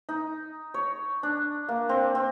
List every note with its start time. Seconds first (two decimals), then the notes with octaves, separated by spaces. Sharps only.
0.09 D#4
0.74 C#5
1.23 D4
1.69 A#3
1.89 C4
2.15 C4